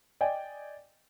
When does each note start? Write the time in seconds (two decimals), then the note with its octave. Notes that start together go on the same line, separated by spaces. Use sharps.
0.21 D5 D#5 G5 G#5